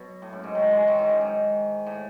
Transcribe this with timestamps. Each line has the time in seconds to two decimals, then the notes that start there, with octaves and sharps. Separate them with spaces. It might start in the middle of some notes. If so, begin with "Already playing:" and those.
Already playing: B2 F#3
0.22 A2
0.33 F#2
0.44 G#2
0.55 D#3 F#3
0.71 E3 G#3
0.88 D#3 F#3
0.99 G#2
1.09 F#2
1.21 G#2
1.86 A2